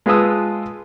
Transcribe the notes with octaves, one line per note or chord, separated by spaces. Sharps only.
G#3 F4 B4 A5 D#6 E6